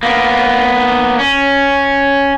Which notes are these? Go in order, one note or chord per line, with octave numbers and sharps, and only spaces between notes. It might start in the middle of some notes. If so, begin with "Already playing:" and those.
A#3 B3
C#4